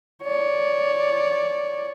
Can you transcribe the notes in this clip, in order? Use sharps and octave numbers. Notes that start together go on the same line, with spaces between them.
C#5 D5